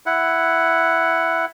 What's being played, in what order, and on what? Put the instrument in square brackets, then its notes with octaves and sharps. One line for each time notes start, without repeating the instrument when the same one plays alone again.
[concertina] E4 F#5